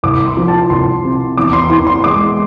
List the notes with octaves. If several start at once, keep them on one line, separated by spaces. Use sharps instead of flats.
C2 D6
C6
F3
A5
C2 C6
C3
E2 D6
C6
E3 C6
C6
G#3 D6